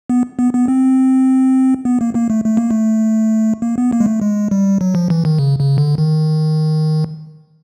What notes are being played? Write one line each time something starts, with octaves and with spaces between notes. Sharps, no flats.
B3
B3
B3
C4
B3
A#3
A#3
A3
A3
A#3
A3
A#3
B3
A#3
G#3
A3
G#3
G3
F#3
F3
E3
D#3
C#3
C#3
D3
D#3